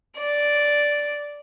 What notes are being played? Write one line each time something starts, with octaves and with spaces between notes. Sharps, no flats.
D5